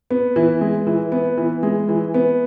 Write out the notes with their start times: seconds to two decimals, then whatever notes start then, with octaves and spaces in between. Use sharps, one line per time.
0.11 B3
0.36 E3
0.61 G#3
0.87 E3
1.12 B3
1.38 E3
1.63 G#3
1.89 E3
2.14 B3